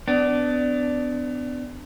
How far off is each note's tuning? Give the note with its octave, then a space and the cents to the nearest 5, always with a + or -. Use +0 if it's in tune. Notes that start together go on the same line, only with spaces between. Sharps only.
B3 +35 D4 +0